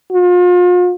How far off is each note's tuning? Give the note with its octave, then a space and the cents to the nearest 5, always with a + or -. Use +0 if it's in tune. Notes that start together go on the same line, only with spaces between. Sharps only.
F4 +40